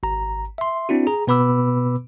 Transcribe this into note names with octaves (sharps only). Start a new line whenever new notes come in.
G#1 A#5
E5 C6
C4 D4 E4 F#4
G#4 A#5
B2 B3 B4 B5 D6 E6